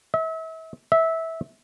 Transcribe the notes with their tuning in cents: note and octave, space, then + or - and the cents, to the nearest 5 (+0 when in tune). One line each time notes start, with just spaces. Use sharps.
E5 -35
E5 -15